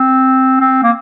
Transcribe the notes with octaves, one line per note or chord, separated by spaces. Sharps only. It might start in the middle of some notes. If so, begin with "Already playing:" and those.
Already playing: C4
C4
A#3